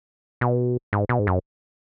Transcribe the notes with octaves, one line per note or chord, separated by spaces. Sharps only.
B2
G#2
B2
G#2
F#2